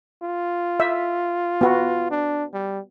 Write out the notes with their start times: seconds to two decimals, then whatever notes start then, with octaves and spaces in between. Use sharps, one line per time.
0.23 F4
0.80 E5
1.61 B3 F#4
2.11 D4
2.53 G3